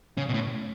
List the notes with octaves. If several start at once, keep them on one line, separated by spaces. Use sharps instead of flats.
C#3
B2
A2